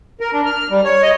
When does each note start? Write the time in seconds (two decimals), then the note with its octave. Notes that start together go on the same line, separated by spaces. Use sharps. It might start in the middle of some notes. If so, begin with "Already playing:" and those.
0.21 A#4
0.33 D4
0.45 F6
0.70 G3
0.84 C#5
1.02 D#5